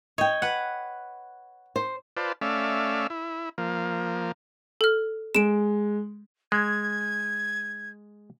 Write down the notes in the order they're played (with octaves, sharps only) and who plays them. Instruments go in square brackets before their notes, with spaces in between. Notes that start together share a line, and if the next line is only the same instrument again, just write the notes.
[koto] C#5 [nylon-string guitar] D#5 G5
[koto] B4 F#5
[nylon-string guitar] C5
[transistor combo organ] F4 B4 C5 D5 A5
A3 C#4 D5 E5 F5
E4
F3 A#3
[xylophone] A4 F6
[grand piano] G#3 [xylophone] D7 E7
[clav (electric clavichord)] G#3 [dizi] G#6